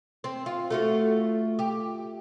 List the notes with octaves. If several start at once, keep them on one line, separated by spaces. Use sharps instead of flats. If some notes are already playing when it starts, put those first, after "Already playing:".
C4
F4
A3 F4 F#4
G4